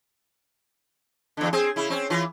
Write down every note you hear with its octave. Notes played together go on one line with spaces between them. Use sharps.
E2 D3
C4 G#4
C#3 E4
C4 C#4
E3 F4